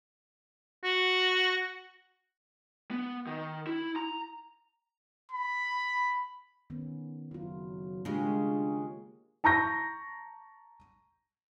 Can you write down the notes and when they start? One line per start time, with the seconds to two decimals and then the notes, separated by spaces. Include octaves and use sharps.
0.84 F#4
2.91 B3
3.26 D#3
3.67 E4
3.96 A#5
5.31 B5
6.70 D#3 B3 C#4
7.31 F#1 F#3 E4 F4
8.05 C#3 G#3 A#3 D4 F4 G4
9.44 A5 A#5 C#6 G6 A#6